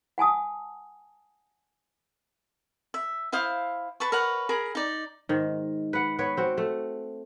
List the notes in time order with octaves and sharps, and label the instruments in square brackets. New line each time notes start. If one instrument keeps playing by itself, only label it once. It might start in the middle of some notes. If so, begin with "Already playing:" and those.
[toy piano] F#5 G#5 A5 D#6
[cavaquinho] E5
E4 C5 F5 D#6
B4 A5 C#6
A#4 B4 C#5 F#5
G#4 A#4 A#5 B5
D#4 D5
[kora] G#2 D#3
B4 F#5
B3 B4 C#5
C4 F#4
A3